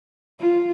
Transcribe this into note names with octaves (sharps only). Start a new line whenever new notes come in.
F4